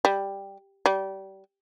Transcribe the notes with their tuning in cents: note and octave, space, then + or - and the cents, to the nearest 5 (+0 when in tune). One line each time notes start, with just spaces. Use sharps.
G3 +5
G3 -25